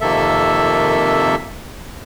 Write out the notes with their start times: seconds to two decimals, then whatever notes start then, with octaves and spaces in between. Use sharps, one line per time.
0.01 F2 C3 D#3 A#3 A4 E5